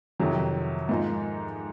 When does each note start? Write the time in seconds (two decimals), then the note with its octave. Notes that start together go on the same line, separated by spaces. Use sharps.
0.19 F2 C3 D#3 F#3
0.89 G#2 F3 A#3 D#4